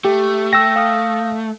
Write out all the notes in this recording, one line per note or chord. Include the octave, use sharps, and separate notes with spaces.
A3 G4
G5 E6 A#6
F5 D#6 F6